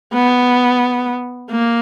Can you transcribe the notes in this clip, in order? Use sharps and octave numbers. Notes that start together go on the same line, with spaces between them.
B3
A#3